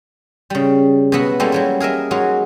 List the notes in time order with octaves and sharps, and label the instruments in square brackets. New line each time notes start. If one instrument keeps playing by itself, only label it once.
[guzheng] C#3 G3
B2 F#3 B3 E5 F#5
G3 G#3 A#3 C#4 E4 A4
F#3 G3 E4
G#4 A#4 D#5 E5
F#3 G#3 D#4 F#4